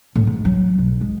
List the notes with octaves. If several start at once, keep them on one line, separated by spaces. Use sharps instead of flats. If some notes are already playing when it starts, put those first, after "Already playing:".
A2
G#2
F#3
B1
G#3